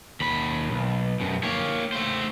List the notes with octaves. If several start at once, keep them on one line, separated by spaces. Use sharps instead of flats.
D#2 B5
B1
F#2 B2
A#3 C#5
A3 C5